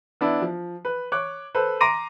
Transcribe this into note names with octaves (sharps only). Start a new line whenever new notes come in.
B3 D4 E4
F3
B4
C#5 D6 F#6
A4 B4 C5
A#5 C6 D6 A#6 D7 D#7